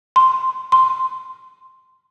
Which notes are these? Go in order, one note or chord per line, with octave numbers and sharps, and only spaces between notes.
C6
C6